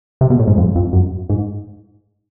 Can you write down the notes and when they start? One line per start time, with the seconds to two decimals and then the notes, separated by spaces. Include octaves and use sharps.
0.21 C3
0.30 B2
0.39 A2
0.48 G#2
0.58 F2
0.75 F2
0.93 F#2
1.30 G#2